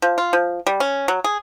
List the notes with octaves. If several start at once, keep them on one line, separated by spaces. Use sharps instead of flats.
F3
F4
F3
G3
C#4
F#3
G#4